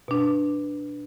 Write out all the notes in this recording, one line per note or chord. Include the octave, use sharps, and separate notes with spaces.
B2 D4